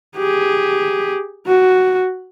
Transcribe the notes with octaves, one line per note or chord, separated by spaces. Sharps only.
G4 G#4
F#4